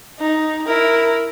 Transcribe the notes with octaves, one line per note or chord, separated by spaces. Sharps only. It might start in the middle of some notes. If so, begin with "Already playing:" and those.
D#4
E4 A#4